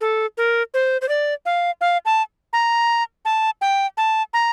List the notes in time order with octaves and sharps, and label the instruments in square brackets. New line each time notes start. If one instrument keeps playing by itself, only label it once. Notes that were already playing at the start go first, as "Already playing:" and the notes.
[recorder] A4
A#4
C5
C5
D5
F5
F5
A5
A#5
A5
G5
A5
A#5